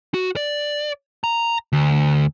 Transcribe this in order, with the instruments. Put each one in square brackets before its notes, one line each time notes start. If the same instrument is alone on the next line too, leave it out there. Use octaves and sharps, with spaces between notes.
[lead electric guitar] F#4
D5
A#5
D2